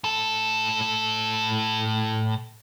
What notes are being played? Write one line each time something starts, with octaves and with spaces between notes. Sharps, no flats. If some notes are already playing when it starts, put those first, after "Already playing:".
A2 A4